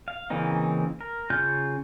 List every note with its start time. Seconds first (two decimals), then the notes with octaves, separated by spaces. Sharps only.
0.08 F5
0.30 C#3 E3 A#3 C4 D#4
1.01 A#4
1.30 C#3 F4 F6 G6